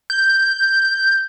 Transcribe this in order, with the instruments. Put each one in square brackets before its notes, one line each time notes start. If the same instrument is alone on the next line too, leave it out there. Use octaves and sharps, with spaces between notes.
[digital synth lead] G6